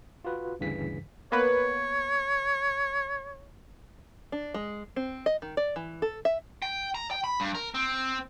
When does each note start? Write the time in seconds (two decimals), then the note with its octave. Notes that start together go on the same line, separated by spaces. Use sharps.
0.25 F4 F#4 B4
0.59 G1 D2 G2 C#3 E3 B6
1.32 A#3 B3 B4 C#5
4.32 D4
4.54 G#3
4.96 C4
5.26 D#5
5.42 D#3
5.57 D5
5.76 E3
6.02 A4
6.25 E5
6.62 G5
6.95 A#5
7.11 G5
7.24 B5
7.40 G2
7.55 A#4
7.74 C4